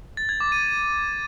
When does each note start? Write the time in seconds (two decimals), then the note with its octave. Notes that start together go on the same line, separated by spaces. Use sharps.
0.17 A6
0.29 G#6
0.40 D6
0.52 D#7